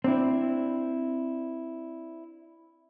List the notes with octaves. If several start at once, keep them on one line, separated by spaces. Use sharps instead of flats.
C4 D4 E4